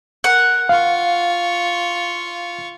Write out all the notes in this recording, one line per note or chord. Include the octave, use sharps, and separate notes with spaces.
A#4 F#5
F4 F5 C#6